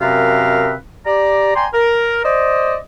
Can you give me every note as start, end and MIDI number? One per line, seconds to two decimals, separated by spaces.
0.01 0.74 42
0.01 0.74 48
0.01 0.74 60
0.01 0.74 70
0.01 0.74 71
0.01 0.74 77
1.06 1.53 67
1.06 1.53 74
1.06 1.53 82
1.55 1.67 74
1.55 1.67 79
1.55 1.67 80
1.55 1.67 82
1.55 1.67 84
1.74 2.21 70
2.25 2.77 72
2.25 2.77 74
2.25 2.77 75